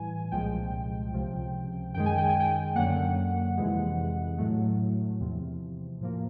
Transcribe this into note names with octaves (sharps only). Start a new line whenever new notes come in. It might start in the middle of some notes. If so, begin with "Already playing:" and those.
Already playing: A2 E3 G3 G#5
C2 A#2 F3 G#3 G5
C#2 C3 F3
F#2 D#3 G#3 G5
G#5
G5
G#5
G5
F#2 D3 F#3 A#3 F#5
F2 C3 E3 G#3
A2 F#3 A3
E2 C3 F3
A2 F3 A#3